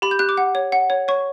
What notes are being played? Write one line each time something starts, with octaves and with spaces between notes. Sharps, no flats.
G4 B5
G6
G4 F#6
D6
F#5
C#5
F#5
C#5
C#5 C#6